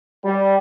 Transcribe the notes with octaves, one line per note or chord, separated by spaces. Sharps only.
G3